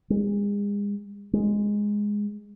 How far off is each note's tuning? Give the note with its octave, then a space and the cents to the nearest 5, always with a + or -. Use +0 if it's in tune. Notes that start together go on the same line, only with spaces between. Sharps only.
G#3 -35
G#3 -5